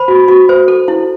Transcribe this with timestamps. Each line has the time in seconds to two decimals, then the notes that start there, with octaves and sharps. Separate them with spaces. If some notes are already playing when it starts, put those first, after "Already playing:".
Already playing: C5 B5
0.08 F#4
0.28 F#4
0.49 C5
0.68 A4
0.88 E4